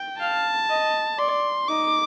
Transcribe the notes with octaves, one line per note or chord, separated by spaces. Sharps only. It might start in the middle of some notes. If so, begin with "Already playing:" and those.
Already playing: G5
F5 A5
D#5
D5 C6
D#4 D6